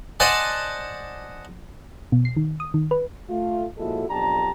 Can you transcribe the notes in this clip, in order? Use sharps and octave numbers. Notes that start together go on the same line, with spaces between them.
C5 D5 D#5 F#5 G#5 A5
B2
C7
D#3
D#6
D#3
B4
A3 F4
A#2 F3 G#3 E4 F#4 A4
B1 F2 D4 G4 A5 A#5